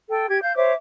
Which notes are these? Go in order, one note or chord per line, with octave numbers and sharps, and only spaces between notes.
A4 G5
G4 G#6
F5 G6
C5 C#5 E5 D6